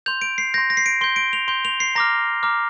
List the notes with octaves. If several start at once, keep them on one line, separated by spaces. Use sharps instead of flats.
C6 G6 F7
D7
C7
C6 G6 A#6
A#6
C7
D7
C6 G6 G7
D7
F7
C6 G6 G7
F7
C7
A#5 D6 F6 A#6
A#5 D6 F6